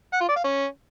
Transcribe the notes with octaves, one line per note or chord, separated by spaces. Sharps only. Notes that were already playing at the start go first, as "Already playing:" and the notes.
F#5
F4
D5
F5
C#4